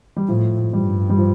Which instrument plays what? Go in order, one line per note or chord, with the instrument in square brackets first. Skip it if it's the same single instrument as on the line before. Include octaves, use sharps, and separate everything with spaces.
[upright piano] G3
[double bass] A2 [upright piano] F3
[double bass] G2 [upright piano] G3
[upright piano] G3
F3